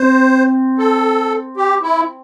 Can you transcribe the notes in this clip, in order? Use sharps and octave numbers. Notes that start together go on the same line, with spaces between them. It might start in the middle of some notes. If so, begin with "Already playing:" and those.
Already playing: C4 C5
A4
G4
E4